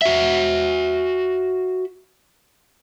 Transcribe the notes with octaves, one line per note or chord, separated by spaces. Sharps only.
F#4 E5